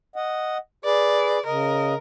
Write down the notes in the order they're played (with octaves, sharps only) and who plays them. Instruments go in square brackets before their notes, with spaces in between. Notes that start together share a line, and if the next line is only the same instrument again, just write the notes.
[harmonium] D#5 F#5
[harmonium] G#4 B4 [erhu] D5
[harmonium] C#3 D#5 [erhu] A#4